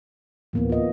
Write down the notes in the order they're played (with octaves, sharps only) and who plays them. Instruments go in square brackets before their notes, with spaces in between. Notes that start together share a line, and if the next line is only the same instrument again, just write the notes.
[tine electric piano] D2 A2 [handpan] E3 A#3 B3
[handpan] F4 D#5